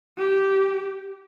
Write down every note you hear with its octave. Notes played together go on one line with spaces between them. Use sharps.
G4